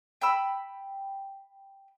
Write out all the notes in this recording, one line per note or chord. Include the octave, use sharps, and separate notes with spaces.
G5 B5 E6